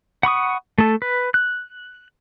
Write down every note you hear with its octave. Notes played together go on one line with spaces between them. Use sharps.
F#5 B5 C#6 D#6
A3 A4
B4
F#6